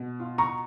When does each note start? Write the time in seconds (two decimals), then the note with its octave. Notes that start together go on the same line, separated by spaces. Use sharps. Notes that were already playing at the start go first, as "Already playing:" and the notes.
Already playing: B2
0.20 F4
0.38 A#5 C#6